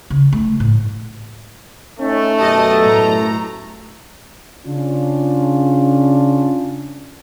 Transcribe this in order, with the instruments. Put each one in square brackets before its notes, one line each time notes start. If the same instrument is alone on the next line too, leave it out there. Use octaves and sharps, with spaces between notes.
[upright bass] C#3
A3
A2
[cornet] A3 [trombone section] C#4 D#4
[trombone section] F#2 B2 A4 [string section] G4 D#5 A5
[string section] A2 A#5
[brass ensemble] C#3 C#4 D4 F4